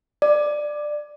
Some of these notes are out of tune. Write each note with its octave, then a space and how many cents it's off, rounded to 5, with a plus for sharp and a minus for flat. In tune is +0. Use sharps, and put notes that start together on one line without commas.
D5 +15